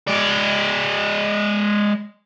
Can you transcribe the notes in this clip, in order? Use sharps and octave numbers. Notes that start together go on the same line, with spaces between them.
G#3 D5